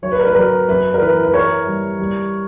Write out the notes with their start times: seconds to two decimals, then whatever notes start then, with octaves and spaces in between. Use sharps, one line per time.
0.02 F#3 C#5
0.12 B4
0.19 A#4
0.27 B4
0.35 F#3 A#4
0.68 F#2 B4
0.94 A#4
1.01 E3 B4
1.23 B4
1.34 E3 A#4 C#5
1.67 G3
2.00 G3